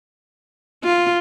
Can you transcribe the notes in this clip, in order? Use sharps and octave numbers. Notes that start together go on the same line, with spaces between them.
F4